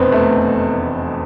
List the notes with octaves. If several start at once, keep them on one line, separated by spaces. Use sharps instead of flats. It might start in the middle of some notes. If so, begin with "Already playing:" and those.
Already playing: F1 E2 B2 B3 C4
A3